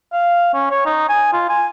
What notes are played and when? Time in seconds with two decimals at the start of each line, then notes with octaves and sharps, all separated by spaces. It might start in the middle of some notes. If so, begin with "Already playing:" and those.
0.13 F5
0.54 C#4
0.70 C#5
0.86 D#4
1.09 G#5
1.33 F4
1.49 G#5